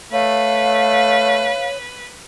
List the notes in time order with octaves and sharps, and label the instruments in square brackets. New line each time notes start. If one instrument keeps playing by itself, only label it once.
[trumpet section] A3 [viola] B4 [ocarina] C#5 [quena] F5